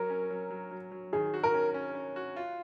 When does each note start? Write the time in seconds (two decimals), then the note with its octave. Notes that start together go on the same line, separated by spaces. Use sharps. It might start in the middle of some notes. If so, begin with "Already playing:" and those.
Already playing: F#3 A#4
0.10 C#4
0.30 F#3
0.51 F#3
0.71 F#3
0.92 F#3
1.13 D#3 G#4
1.34 F#4
1.43 A#4
1.54 C#4
1.74 C#4
1.95 C#4
2.16 F#4
2.36 F4